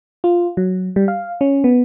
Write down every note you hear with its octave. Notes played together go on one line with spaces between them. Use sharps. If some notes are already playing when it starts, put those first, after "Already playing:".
F4
F#3
G3
F5
C#4
B3